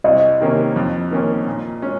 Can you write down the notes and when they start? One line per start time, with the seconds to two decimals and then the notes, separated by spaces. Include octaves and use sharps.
0.04 C2 D#5
0.40 C3 D#3 A#3 C#4
0.76 F2
1.11 D#3 A#3 C#4
1.46 A#2
1.82 G#3 C#4